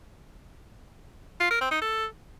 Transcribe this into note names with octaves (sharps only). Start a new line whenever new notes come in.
F4
A#4
C4
D#4
A4